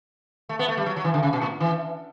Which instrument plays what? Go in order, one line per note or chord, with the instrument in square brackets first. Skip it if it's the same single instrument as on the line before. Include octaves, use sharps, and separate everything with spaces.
[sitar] A3
B3
A3
G3
F#3
F#3
E3
D3
C#3
B2
A2
E3